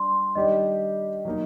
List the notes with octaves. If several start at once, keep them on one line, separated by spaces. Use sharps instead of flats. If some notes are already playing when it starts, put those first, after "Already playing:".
Already playing: G3 D4 D5 C6
D#3 G3 D4 G4 D5 D#5
F#3 A#3 D#4